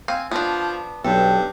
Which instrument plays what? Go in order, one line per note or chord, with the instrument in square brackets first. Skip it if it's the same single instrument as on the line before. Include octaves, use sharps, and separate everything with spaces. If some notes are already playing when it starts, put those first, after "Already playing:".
[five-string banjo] C4 F5 G#5
[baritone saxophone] F3 [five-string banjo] B3 D4
[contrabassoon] B1 [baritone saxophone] G2 [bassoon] G4 [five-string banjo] A4